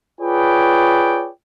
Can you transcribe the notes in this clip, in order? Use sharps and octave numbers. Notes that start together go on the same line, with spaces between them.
F4 G#4 B4 C#5 D5 G5